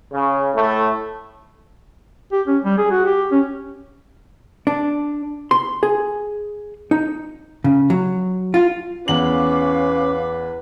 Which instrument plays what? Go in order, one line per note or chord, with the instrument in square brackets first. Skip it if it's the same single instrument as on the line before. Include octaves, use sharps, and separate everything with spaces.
[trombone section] C#3
A2 A3
[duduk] G4
C#4
G3
G#4
F#4
G4
C#4
[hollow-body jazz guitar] D4
C6
G#4
D#4
C#3
F#3
F4
[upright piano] E2 F#7 [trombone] C#4 [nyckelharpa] B4 [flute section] F5 D6